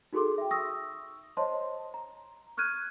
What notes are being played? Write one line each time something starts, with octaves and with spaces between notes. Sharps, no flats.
D#4 F#4 G#4 A4 C6 D6
E5 G5
C#6 D#6 E6 A#6
C5 C#5 D#5 A5 C6
A#5
C#6 F6 F#6 G#6 D#7